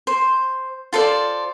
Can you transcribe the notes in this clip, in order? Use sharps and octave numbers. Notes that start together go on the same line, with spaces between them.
C5
F4 A4 C5 D5